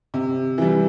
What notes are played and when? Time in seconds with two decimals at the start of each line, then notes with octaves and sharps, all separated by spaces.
0.14 C3
0.58 E3 G3